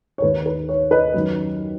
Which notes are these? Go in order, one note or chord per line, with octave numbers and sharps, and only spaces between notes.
C#5
D#2 D#3 B4
B4
C#5
B4 D#5
F#2 D#3